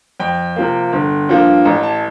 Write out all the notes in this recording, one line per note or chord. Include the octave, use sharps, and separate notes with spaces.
F2 G5
C3 F3 A#3
G1
G2 F3 A#3
A1 A#5
A5